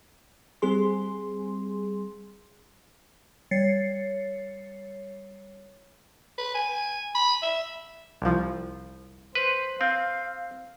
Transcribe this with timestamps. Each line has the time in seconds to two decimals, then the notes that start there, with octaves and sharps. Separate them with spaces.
0.62 G3 C4 G#4 C6
3.51 G3 C#5 A6 C7 C#7
6.38 B4
6.55 G#5
7.15 B5
7.43 E5
8.22 C2 F3
9.35 B4 C5
9.81 C4 F5